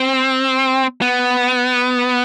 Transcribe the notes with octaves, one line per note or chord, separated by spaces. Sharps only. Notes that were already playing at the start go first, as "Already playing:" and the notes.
Already playing: C4
B3